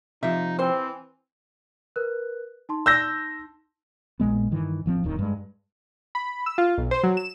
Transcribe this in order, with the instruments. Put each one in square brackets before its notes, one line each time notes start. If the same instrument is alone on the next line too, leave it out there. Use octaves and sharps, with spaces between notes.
[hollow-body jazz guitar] C3 F3 [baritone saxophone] D#4 [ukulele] E5
[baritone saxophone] E3 [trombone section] C4 [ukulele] C5
[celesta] A#4 B4 F#6
D#4 A5 C6
[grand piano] E6 G6 A#6
[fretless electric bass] A#1 A#2 G#3 B3
G2 D#3 E3
A1 F3 A#3 C4
D1 D#2 D#3
G2 G#3
[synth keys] B5
E6
F4
B1
C5
F#3
E7